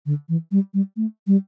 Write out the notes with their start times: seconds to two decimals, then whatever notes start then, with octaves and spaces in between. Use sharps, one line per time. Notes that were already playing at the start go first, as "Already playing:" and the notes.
0.06 D3
0.29 E3
0.52 G3
0.74 G3
0.97 A3
1.27 G3